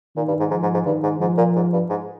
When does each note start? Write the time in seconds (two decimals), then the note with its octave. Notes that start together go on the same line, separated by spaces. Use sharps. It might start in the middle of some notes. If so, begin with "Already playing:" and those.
0.16 A#2 D#3
0.28 G2
0.40 G#2
0.51 G#2 F3
0.62 G#2
0.74 G#2
0.85 G2 D#3
1.03 G#2
1.20 G#2 F3
1.38 A#2
1.56 G#2
1.73 G2
1.90 G#2